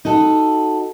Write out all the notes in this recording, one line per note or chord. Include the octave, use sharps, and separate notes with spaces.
D#4 F#4 A4